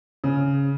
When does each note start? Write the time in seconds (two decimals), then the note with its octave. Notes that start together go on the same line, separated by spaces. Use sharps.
0.24 C#3